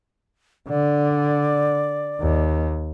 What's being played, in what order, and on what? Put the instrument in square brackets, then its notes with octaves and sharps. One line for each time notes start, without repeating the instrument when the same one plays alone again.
[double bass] D3 [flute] D5
[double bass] D#2